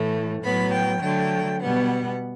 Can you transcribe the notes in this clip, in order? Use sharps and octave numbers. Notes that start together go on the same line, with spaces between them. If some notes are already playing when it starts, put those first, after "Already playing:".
Already playing: A2 E3 A3
A2 F#3 B3 B5
G5
D3 F#3 A3 G5
B2 G3 B3 F#5